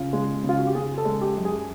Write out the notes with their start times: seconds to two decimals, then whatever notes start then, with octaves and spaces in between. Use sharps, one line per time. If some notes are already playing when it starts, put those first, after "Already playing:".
Already playing: C#3 F4
0.13 G#3
0.44 C#3 F4
0.59 F#4
0.67 G4
0.75 C#3 G#4
0.98 A4
1.05 G#3
1.21 G4
1.37 F#2
1.45 G#4